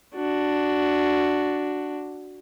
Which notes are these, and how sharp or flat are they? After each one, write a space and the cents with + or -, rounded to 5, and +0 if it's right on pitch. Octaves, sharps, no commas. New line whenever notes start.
D4 +0 F#4 +0